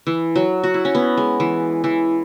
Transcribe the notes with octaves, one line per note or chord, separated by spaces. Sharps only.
E3
F#3
F#4
E4
C#4
B3
G#3
E3
E3